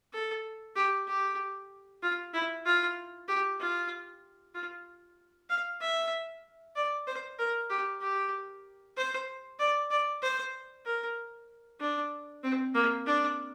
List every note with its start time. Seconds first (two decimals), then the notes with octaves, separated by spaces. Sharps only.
0.13 A4
0.76 G4
1.07 G4
2.03 F4
2.33 E4
2.65 F4
3.28 G4
3.60 F4
4.54 F4
5.49 F5
5.81 E5
6.75 D5
7.07 C5
7.39 A#4
7.70 G4
8.01 G4
8.97 C5
9.59 D5
9.90 D5
10.22 C5
10.86 A#4
11.80 D4
12.43 C4
12.75 A#3
13.06 D4